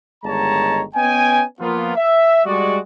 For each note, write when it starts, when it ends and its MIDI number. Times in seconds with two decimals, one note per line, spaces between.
0.24 0.83 31
0.24 0.83 51
0.24 0.83 56
0.24 0.83 73
0.24 0.83 81
0.24 0.83 82
0.95 1.44 59
0.95 1.44 61
0.95 1.44 71
0.95 1.44 75
0.95 1.44 79
0.95 1.44 80
1.60 1.96 53
1.60 1.96 58
1.60 1.96 59
1.60 1.96 65
1.96 2.42 76
2.46 2.79 55
2.46 2.79 56
2.46 2.79 66
2.46 2.79 74